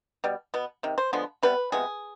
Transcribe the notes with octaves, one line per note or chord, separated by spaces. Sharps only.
B2 G3
B2 B3
C3 D#3
C5
D3 F3 G#3 B3
C3 G3 B3 B4
C3 F3 G#3 B3 G#4